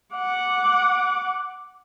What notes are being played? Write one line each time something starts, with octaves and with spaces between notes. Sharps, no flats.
F#5 D6